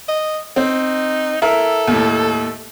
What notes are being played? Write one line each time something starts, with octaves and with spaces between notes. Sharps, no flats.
D#5
C4 D#4
E4 A4 A#4
D#2 A2